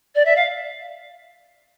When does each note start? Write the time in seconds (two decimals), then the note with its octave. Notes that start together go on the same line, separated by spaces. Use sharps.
0.15 D5
0.25 E5
0.36 F5